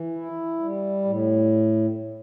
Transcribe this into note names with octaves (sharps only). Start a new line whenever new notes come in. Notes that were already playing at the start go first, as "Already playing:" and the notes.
Already playing: E3
E4
G3
A2